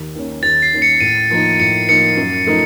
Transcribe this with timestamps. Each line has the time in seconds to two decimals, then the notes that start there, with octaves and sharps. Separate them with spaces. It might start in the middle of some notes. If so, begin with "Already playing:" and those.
Already playing: D#2
0.14 D#3 A#3 C#4
0.42 D#2 A6
0.62 C7
0.72 D#3 A#3 C#4
0.82 C#7
1.00 A2 D#7
1.30 F3 A#3 D#4 A#4
1.59 A2 C#7
1.89 F3 A#3 D#4 A#4 C#7
2.17 F#2
2.46 F3 A3 D#4 A#4